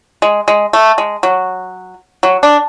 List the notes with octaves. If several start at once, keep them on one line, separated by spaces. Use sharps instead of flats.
G#3
G#3
A3
G#3
F#3
F#3
D4